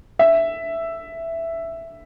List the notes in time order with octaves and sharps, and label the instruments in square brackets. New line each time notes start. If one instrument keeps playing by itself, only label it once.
[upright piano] E5